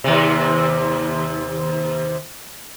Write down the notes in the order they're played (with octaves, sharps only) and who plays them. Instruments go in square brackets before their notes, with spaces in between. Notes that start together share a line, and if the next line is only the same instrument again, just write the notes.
[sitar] D#2 C3